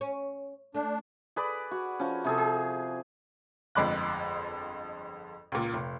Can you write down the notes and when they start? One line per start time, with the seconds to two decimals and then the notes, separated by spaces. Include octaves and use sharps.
0.01 C#4
0.74 A3 D4
1.36 G#4 B4 D5
1.71 F#4
1.99 F3 C#4
2.24 C3 G#4 A4
2.38 G#4
3.75 G1 F2 G#3 B5 D6 F#6
5.52 C#2 A#2
5.73 F1